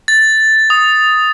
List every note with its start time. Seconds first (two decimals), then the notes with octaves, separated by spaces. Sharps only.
0.08 A6
0.70 D#6